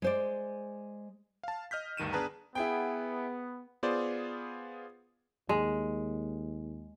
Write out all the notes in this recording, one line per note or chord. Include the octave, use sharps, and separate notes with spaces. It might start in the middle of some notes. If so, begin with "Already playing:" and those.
G#3 C5 D5
F5 A5
D#5 F6 G6 B6
D2 G2 D#3 D#7 E7
B3 D4 G#4 B4 A5 A#5
B3 E4 G#4 G5
B3 F4 G#4 C5 D5
D#2 G#3